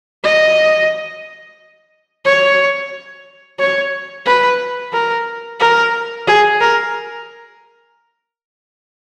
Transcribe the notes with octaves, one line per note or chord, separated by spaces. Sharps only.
D#5
C#5
C#5
B4
A#4
A#4
G#4
A#4